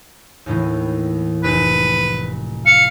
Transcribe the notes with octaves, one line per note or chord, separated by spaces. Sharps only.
D#2 A2 E3
F1 B4
F5 C#7